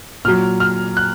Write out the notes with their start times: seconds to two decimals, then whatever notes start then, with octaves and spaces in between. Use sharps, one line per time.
0.25 A#2 F#3 F6
0.60 F6
0.97 F#6